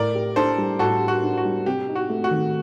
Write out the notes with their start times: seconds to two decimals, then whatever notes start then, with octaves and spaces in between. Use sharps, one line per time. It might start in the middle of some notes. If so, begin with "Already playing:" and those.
Already playing: A2 A#4 D5
0.15 G4
0.36 D4 A4 C5
0.58 G3
0.79 A2 F#4 A4
1.01 G4
1.08 F#4
1.23 D4
1.37 F#4
1.45 G3
1.66 C3 G4
1.88 D#4
1.95 F#4
2.10 A3
2.24 F#4
2.31 D#3